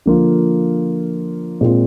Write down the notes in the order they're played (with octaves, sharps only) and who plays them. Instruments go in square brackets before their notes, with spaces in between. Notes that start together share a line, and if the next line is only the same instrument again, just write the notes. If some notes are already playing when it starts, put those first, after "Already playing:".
[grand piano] D3 F3 A#3 F4
A#2 G#3 C4 F4